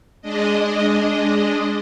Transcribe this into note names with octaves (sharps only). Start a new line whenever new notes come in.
G#3 D4 D#5